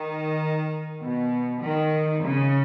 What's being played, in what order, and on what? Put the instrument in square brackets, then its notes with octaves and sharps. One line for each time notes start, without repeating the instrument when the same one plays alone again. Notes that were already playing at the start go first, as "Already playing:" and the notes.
Already playing: [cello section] D#3
B2
D#3
C#3